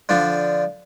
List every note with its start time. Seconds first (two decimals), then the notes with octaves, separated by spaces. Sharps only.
0.09 D3 F3 D4